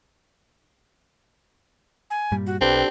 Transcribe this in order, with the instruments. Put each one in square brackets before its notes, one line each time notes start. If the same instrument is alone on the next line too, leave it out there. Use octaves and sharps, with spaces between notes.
[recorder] G#5
[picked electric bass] G2 A#2 G3
[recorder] F#4
[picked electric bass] B1 [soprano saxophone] C4 [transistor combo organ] D4 G4 A4 [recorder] B4